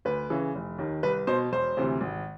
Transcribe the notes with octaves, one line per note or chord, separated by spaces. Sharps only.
D2 B4
C#3 E3
F1
D#2 D#3
C2 B4
B2 C5
E1 C5
D2 C3 E3
G#1